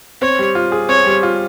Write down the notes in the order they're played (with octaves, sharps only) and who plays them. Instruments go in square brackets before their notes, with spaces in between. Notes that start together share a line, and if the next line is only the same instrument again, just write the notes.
[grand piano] C4 [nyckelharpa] C#5
[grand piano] G3
F4
G#4
[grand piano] C4 [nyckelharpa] C#5
[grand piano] G3
F4